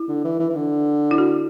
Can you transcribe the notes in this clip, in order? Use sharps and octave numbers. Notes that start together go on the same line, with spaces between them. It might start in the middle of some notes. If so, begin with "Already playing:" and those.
Already playing: E4
D3
E3
E3
E3
D3
E4
F#4